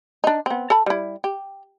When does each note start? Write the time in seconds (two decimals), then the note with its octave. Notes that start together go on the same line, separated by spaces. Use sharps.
0.24 D4 D#4
0.46 B3 C4
0.70 A4 A5 B5
0.86 G3 E4
1.24 G4